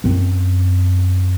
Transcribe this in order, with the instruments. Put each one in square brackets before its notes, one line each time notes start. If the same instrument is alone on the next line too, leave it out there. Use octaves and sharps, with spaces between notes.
[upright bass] F#2 C4